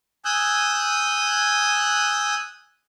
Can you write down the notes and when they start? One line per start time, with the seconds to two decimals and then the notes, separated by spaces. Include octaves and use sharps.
0.25 G#5 D#6 E6 F#6 G6